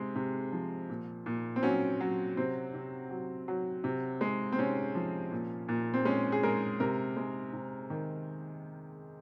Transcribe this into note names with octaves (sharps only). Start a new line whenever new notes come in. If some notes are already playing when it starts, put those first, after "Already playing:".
Already playing: C3 G#3
C3
F3
A#2
A#2
C4
F#3 C#4
F#3
C3 C4
C3
F#3
F#3
C3
G#3
C4
C3 C#4
F3
A#2
A#2
C4
G#3 C#4
G#4
G#3 A#4
C3 A#4
G#3
C3
D#3